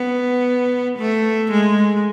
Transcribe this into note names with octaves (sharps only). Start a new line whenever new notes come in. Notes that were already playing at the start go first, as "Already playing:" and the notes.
Already playing: B3
A3
G#3